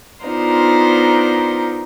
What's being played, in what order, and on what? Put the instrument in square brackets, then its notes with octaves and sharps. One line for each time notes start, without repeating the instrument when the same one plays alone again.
[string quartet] B3 D4 D#4 F4 A#4 C5